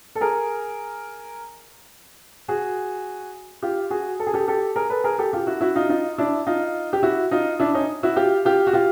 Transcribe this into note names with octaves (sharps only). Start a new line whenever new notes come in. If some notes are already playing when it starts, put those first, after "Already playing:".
A4
G#4 A#4
F#4 G#4
F4 G4
F#4 G#4
A4
G#4
G4 A4
G4 A4
G#4 A#4
A4 B4
G#4 A#4
G4 A4
F4 G4
E4 F#4
E4 F#4
D#4 F4
D#4 F4
D4 E4
D#4 F4
G4
E4 F#4
D#4 F4
D4 E4
C#4 D#4
E4 F#4
F4 G4
F4 G4
F#4
F4 G4